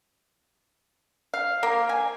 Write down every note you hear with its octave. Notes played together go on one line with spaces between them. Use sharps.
F5
A#3
G#5